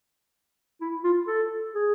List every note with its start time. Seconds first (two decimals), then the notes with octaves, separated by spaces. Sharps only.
0.81 E4
1.04 F4
1.28 A4
1.75 G#4